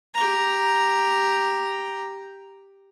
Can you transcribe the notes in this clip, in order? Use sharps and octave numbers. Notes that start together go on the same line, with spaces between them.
G4 A#5